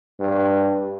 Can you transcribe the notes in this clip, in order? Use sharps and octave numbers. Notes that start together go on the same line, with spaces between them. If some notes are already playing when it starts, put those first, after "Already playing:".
G2